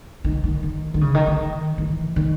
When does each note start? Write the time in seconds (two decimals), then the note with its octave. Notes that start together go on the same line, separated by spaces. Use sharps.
0.24 D#3
0.44 D#3
0.63 D#3
0.94 D#3
1.01 C#3
1.14 D#3
1.27 D#3
1.78 E3
2.16 D#3